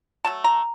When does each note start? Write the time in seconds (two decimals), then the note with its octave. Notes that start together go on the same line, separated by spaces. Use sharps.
0.25 F#3 A3 A5
0.44 A#5